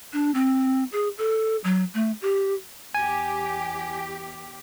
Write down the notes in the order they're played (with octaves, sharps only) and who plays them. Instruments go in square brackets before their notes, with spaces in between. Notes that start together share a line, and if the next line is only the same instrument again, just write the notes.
[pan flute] D4
C4
G#4
A4
F#3
A3
G4
[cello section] E2 G4 [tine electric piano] G#5